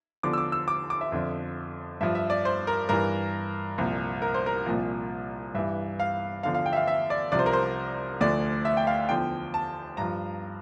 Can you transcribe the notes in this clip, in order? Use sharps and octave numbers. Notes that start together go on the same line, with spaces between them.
E2 D3 F3 D6
E6
D6
E6
D6
D6
E5
F2 D3 F3
G2 F3 E5
E5
D5
C5
A#4
G2 E3 A#4
C2 A#2 F3
A#4
C5
A#4
C2 A#2 F3
G2 E3 E5
F5
E2 D3 F3 F5
F5
G5
E5
F5
E5
D5
C2 C3 F3 D5
C5
A#4
C5
D2 D3 F3 D5
E5
G5
F5
E2 D3 F3 G5
A5
G2 F3 A#5